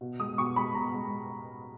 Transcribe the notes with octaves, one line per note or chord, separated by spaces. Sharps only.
B2
G#3 D#6
B2 C#6
G#3 B5
B2 A#5
G#3